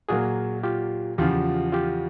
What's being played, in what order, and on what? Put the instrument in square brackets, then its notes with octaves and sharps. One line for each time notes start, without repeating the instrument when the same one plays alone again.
[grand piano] A#2 F#3 A#3 [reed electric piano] F#4 G#4
[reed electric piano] F4 G4
[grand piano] E2 C#3 F3 [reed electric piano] F4 G4
[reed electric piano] F4 G4